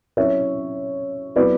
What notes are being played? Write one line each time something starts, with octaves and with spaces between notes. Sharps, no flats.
F#3 C#4 E4 C#5 E5
F#3 B3 E4 B4 D5